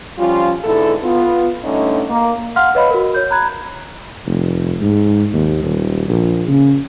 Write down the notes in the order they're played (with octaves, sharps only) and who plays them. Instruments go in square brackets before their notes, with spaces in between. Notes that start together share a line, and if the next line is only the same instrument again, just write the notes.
[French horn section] F3 G3 C#4 F4
G#2 B2 D3 E4 A4
B3 F4
G2 D3 A3 C#4 D#4
A#3
[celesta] F5 F#5 C6 F6
B4 C#5 D#5 F5 B5
F#4 A#4
C#5 G6
A#5 B5 F#6 G#6
[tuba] F1
G#2
D#2
D#1
A#1
C#3